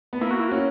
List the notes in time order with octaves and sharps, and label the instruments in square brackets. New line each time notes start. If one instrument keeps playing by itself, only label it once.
[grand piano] B3
[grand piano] A#3 [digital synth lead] E4
[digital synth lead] F#4
E4
[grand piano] C#4 [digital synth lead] F#4